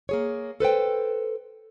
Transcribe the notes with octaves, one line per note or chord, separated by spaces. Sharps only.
A#3 G#4 C#5
A4 B4 C5 G5